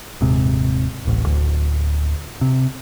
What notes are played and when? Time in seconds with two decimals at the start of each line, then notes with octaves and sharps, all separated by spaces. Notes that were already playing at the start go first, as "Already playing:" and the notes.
0.21 D#1 G#2 C3
1.05 D1 A1
1.25 D1 D2
2.41 C3